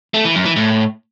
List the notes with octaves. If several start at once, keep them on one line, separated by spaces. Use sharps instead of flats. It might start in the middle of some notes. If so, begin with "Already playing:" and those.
A3
E3
F#2
E3
A2